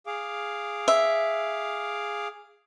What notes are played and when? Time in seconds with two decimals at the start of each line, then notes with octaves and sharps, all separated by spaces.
0.06 G#4 F5 D6
0.88 E5